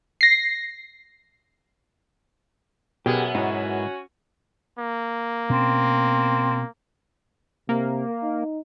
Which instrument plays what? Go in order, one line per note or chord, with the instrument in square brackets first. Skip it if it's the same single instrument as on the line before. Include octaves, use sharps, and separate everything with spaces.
[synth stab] A#6 C7
[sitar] F#2 B3 [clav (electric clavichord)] B2 [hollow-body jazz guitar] G4 [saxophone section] G#4 A#4
[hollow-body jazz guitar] G#2 D#4 E4 [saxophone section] C#4 F#4
[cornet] A#3
[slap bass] B2 C#4 [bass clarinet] C4
[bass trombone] C3 [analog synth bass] A#3
[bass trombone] D#4